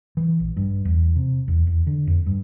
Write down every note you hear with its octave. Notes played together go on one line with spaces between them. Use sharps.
E3
A#1
G2
E2
C3
E2
E2
D3
F2
G2